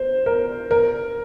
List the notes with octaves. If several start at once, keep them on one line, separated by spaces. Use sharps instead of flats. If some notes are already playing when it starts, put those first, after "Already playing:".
Already playing: C5
A#4
A#4